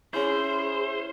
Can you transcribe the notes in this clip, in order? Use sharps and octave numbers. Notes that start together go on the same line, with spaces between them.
C#4 E4 G#4 C5